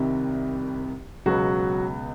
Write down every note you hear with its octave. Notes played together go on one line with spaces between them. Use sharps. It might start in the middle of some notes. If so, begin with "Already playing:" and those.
Already playing: C2 C3 D#3 G3
C#2 B2 F#3 G#3 B3 F#4